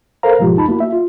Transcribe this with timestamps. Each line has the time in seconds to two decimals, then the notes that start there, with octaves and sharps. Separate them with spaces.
0.23 A4 A#4 C5 F5 A#5
0.39 G#2 B2 F3 G#3 F4 G4
0.55 C2 F2 D#4 A5 B5
0.68 A#3 E4 F#4
0.80 E5
0.93 F4